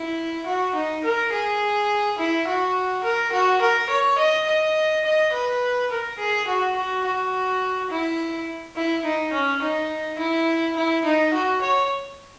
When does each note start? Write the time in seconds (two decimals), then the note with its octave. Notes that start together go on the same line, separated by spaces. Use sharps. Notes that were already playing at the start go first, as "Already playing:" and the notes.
Already playing: E4
0.46 F#4
0.75 D#4
1.04 A#4
1.32 G#4
2.18 E4
2.47 F#4
3.04 A#4
3.33 F#4
3.62 A#4
3.90 C#5
4.18 D#5
4.47 D#5
5.05 D#5
5.33 B4
5.91 A#4
6.19 G#4
6.47 F#4
6.76 F#4
7.05 F#4
7.90 E4
8.76 E4
9.05 D#4
9.33 C#4
9.62 D#4
10.19 E4
10.77 E4
11.05 D#4
11.34 F#4
11.62 C#5